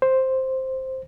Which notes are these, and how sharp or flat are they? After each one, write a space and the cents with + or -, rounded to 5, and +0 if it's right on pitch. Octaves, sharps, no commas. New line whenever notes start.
C5 +5